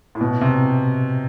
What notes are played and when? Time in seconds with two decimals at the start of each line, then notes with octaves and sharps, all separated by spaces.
0.15 A2
0.21 B2
0.41 C3